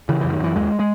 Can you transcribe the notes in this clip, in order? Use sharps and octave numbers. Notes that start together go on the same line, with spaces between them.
C#3 E3
F#2 E3
D#3
F#2 E3
D#2 G#3
G#3